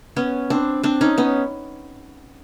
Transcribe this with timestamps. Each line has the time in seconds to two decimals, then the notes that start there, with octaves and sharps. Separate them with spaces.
0.16 B3 C#4
0.50 C4 D4
0.83 C4 D4
1.01 C#4 D#4
1.18 B3 C#4